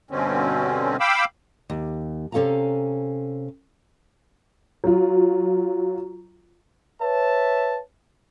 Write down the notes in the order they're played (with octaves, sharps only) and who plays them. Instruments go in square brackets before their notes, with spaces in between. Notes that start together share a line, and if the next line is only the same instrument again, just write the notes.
[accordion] G2 B2 D3 C4 C#4
F5 G5 B5 D6 E6
[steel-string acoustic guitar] D#2
C3 C#4 A4 F5 G#5 A#5
[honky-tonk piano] F#3 F4
[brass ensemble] B4 C#5 E5 A5